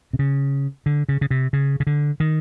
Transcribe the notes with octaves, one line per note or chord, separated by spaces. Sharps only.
C3
C#3
D3
C#3
C#3
C3
C#3
C#3
D3
D#3